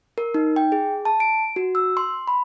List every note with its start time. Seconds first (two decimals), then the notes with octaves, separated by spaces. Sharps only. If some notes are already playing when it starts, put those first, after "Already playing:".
0.18 A#4
0.34 D#4
0.56 G5
0.72 G#4
1.05 A5
1.20 D7
1.56 F#4
1.75 E6
1.97 C6
2.28 B5